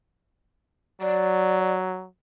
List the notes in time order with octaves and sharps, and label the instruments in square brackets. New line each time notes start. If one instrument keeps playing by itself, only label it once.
[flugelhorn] F#3 [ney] D5